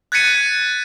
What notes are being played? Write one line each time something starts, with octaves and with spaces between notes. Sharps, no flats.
F#6 G#6 A6 B6 C#7 D#7